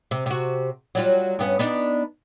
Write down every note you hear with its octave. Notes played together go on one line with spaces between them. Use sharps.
C3
C3 F#4
F#3 G3 F4
G2 B3 C#4
B3 D4 D#4